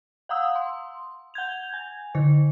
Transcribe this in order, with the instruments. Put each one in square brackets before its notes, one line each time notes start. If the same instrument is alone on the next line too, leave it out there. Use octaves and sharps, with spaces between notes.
[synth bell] F5 F#5 A#5 D#6 E6
C6
F#5 G6 G#6 F7
G#5
D3 C5